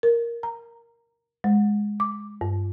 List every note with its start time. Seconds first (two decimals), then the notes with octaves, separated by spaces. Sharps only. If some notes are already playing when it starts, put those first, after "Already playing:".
0.03 A#4
0.43 A#5
1.44 G#3
2.00 D6
2.41 G2